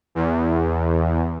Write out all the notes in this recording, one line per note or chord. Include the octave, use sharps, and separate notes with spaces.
E2